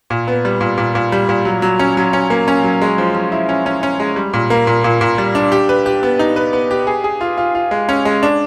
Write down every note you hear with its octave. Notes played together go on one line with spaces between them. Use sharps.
A#2
B3
G3
A#2
A#2
A#2
G3
A#2
F#3
F#3
C#4
F#3
C#4
A#3
C#4
F#3
G#3
F3
F3
E4
C#4
C#4
C#4
G#3
G3
A#2
A#3
A#2
A#2
A#2
G3
D4
G4
B4
G4
B3
D#4
B4
B3
G4
G#4
G#4
F4
F4
F4
G#3
C#4
G#3
D4